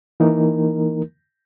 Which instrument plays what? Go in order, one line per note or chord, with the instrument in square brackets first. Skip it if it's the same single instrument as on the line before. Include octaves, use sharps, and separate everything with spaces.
[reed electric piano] E3 A#3 D#4 A#4